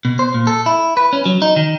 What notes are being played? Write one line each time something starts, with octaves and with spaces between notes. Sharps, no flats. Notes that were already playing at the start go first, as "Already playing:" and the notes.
B2
C5
A#2
A4
E4
B4
C#4
F#3
D#4
D#3